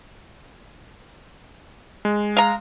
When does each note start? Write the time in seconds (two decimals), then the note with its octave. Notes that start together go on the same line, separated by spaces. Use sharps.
2.05 G#3
2.37 F5 A#5